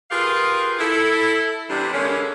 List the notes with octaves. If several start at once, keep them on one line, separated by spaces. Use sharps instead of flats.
F4 G4 G#4 A#4 B4 F5
E4 A4
C3 E3 G3 B3 D4
D3 G#3 A#3 C#4